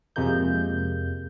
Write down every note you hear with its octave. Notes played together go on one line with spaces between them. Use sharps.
F2 C3 G#3 A#3 G6